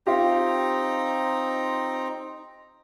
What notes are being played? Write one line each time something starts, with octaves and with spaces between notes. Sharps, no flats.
C4 D#4 F4 G4 A#5